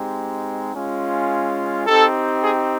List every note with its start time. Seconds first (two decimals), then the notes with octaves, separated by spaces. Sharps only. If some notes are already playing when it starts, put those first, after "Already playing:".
Already playing: G#3 C4 D#4 G4
0.73 G#3 C#4 F4
1.87 C4 D#4 G4 A4
2.43 G#4